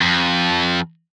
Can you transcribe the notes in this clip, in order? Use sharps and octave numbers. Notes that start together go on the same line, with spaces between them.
F2